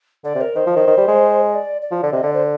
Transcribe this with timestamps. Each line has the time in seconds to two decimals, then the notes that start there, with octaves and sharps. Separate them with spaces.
0.24 D3 D5
0.35 C3
0.41 A#4
0.55 D#3 C5
0.66 F3
0.76 D#3
0.87 D#3
0.98 G3
1.08 G#3
1.50 D#5
1.55 D5
1.82 D5
1.91 F3
2.03 D3
2.13 C3 D#5
2.23 D3 D5
2.33 C5